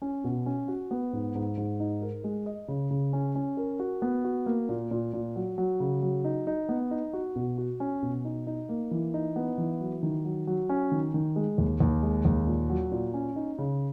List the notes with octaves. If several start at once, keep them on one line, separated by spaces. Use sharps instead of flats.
C#4
B2
C#4
F#4
B3
G#2
G#2
G#2
D#4
A#4
G#3
D#5
C#3
C#3
C#4
C#4
A#4
F#4
B3
F#4
A#3
A#2
A#2
A#2
F#3
F#3
C#3
F#3
D#4
D#4
B3
D#4
F#4
B2
F#4
C#4
B2
D#4
D#4
A#3
E3
D#4
B3
E3
F#3
D#3
F#3
F#3
C#4
D#3
D#3
G#3
D#2
D#2
G#3
D#2
A#2
F#3
A#2
C#4
D#4
C#3